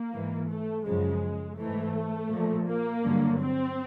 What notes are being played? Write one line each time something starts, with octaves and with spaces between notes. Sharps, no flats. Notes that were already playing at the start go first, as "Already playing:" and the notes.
Already playing: A#3
G#2 E3
A3
F#2 C#3 F3 G#3
G#2 E3 A3
A#2 F3
A#3
G2 D3 F#3
C4